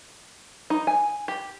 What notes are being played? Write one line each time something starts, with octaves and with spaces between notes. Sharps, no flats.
D#4
G#5
G4